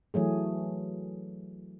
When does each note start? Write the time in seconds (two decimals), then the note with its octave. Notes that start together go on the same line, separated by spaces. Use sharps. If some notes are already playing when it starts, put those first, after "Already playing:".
0.14 E3 F#3 A3 G#4